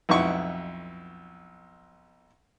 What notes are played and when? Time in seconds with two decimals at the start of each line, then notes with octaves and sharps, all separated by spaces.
0.09 B1 F2 E4 C#6